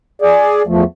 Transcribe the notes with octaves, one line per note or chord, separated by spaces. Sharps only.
G#4 D5
E2 F3 A3